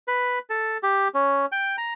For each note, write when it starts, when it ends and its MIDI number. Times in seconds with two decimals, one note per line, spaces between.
0.08 0.39 71
0.50 0.78 69
0.83 1.08 67
1.14 1.46 61
1.52 1.76 79
1.78 1.93 82